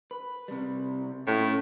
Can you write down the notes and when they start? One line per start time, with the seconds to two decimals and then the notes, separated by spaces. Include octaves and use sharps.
0.11 B4
0.48 C3 G3
1.27 A2 C#4 F4 C#5